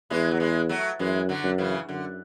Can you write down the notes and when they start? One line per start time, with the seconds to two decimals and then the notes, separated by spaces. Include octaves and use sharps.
0.10 E2 E3 G#3
0.31 F#3
0.40 E3 G#3
0.69 F#3 A3
0.99 F#2 E3 G#3
1.29 D3 F#3
1.44 F#2
1.58 C#3 E3
1.88 F#2 D3